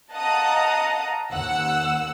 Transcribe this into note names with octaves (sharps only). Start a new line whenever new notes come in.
D#5 F5 F#5 A5 A#5 D#6
D#2 F#5 E6